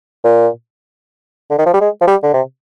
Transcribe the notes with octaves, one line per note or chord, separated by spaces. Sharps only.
A#2
D3
D#3
F3
G3
G#3
F3
G3
D3
C3